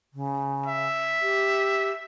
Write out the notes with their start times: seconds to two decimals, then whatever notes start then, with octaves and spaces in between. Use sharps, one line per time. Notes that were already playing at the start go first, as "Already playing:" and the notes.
0.13 C#3
0.66 E5
1.22 G4